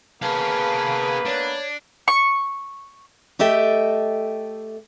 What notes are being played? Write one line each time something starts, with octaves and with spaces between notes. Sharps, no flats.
A#3 B3 G#4 B4 F5 A5
D4 C#5
C#6
A3 G4 A4 D#5 E5 G5